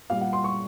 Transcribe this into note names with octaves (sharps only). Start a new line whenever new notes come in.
A#2 G3 F5
F#5
C6
C#6